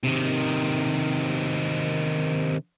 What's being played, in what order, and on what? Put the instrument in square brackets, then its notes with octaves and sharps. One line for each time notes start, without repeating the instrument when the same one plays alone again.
[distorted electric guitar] C3 D#3